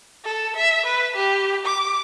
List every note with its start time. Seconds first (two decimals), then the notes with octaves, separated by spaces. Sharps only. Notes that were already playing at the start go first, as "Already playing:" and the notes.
0.25 A4
0.56 E5
0.86 B4
1.16 G4
1.65 D6